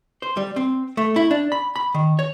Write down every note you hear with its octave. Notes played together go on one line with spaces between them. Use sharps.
C5
G3
C4
A3
E4
D4
B5
B5
D#3
C#5